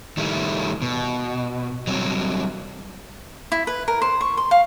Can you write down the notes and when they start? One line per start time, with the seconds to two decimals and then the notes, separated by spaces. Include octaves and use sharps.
0.17 D#3 G3 A3 E4
0.82 B2
1.87 F#3 G3 C4
3.52 E4
3.67 B4
3.88 A#4
4.02 C5
4.21 C#6
4.37 C6
4.51 F5